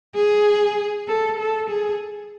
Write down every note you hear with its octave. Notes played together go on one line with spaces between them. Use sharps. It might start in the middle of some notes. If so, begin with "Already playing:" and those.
G#4
A4
A4
G#4